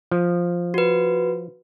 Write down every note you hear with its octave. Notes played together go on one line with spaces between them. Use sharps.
F3
F#4 B4